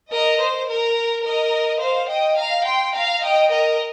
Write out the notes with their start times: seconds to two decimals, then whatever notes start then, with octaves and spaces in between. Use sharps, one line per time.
0.12 A#4 D#5
0.41 C5
0.70 A#4
1.25 A#4 D#5
1.82 C5 F5
2.10 D#5 G5
2.39 F5 A#5
2.67 G5 C6
2.96 F5 A#5
3.24 D#5 G5
3.52 A#4 D#5